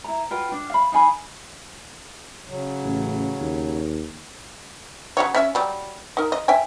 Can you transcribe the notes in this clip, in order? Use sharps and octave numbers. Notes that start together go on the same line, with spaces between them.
E4 A#5
F4 F#4 B4 G5
D4
F5 B5
D#4 F5 G#5 B5
C#3 F#3
A1
D#2
C#3 F#4 C#5
C#4 E5
F#3 G3
D#4 A#4
D#5
E5 G5 G#5